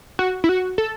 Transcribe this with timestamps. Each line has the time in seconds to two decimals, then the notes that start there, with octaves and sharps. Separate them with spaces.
0.19 F#4
0.44 E4
0.49 F#4
0.78 A4